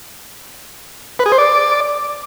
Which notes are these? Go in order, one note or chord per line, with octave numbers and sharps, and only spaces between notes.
B4
G#4
C5
D5